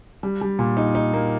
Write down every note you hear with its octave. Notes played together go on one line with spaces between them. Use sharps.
G3
G3
A#2
D#4
D#4
A#3